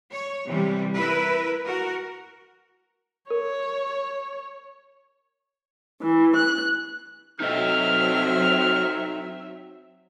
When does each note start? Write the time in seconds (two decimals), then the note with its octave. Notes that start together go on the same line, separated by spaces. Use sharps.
0.14 C#5
0.47 C3 E3 G3
0.95 E4 A#4 B4
1.66 F#4 A#4
3.30 A#4 C#5
6.02 E3
6.36 F#6
7.40 F#3 C4 D#4 A4 D#5 E5 F6